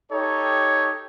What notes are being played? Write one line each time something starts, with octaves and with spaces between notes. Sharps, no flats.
D#4 G4 A4 C#5